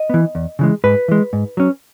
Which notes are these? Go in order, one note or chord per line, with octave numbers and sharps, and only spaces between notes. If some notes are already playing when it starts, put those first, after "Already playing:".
Already playing: D#5
E3 B3
E2
C#3 E3 G#3
G#2 B4
E3 G#3
G#2
F#3 C#4